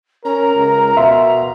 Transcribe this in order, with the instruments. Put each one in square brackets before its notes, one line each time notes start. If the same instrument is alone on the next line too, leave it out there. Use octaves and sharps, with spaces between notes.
[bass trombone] C#4 [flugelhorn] A#4 [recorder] A#5
[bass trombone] C#2
[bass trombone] B2 [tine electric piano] E5 F5 C6